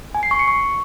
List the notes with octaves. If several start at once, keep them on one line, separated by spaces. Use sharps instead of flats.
G#5
C7
C#6
C#7
C#6